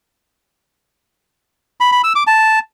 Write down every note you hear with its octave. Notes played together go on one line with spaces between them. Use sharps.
B5
B5
E6
D6
A5